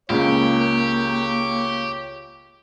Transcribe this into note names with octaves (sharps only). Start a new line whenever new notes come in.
C#2 C#3 A#3 G4 C#5